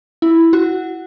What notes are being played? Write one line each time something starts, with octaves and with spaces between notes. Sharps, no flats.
E4
F#4